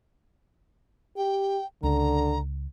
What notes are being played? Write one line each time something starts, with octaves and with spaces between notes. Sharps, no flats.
G4 G5
C#2 D3 A#5